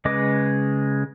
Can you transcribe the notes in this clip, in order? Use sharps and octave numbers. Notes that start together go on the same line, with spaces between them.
C#3 G#3 B4 D#5 D6